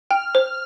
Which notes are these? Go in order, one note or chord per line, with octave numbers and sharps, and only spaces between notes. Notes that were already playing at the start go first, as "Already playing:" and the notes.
G5 F6
C5